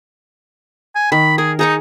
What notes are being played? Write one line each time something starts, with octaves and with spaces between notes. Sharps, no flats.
G#5
D#3 B5
G#4 A#4
D#4 G#4 A#5 C#6